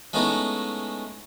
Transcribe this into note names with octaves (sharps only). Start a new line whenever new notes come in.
G#3 A3 B3 C#4 D#4 E4